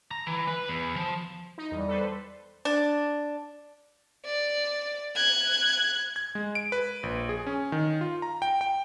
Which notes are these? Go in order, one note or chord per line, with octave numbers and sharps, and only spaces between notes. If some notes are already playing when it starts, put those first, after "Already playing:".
A#5
E3
B4
E2
F3
D#4
E2 G3
A4 B4 C5
D4
D5
F#6 G#6
G#6
G#3
D7
B4
A#1
G#4
C#4
D#3
F4
A#5
G5
G5